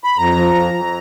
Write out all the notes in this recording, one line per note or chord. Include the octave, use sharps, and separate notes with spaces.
B5
F2 A#5
F3
F2
F2